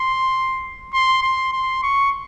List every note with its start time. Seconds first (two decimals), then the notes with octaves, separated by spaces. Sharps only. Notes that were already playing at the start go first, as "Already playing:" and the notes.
Already playing: C6
0.93 C6
1.23 C6
1.53 C6
1.83 C#6